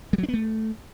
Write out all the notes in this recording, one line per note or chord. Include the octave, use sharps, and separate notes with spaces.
G3
F#3
D4
B3
A3